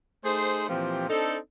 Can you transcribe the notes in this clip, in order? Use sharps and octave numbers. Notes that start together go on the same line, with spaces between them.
A3 D#4 G#4 C5
A#2 E3 F3 C4 G4
C4 D4 D#4 A4